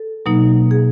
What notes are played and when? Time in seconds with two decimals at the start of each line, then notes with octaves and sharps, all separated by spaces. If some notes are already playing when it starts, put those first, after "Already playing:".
Already playing: A4
0.26 B2 F#3 A#3 D#4
0.71 G#4